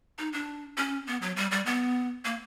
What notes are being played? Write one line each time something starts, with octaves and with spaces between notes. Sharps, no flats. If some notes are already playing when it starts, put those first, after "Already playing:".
D#4
D4
C#4
B3
F#3
G3
G3
B3
A#3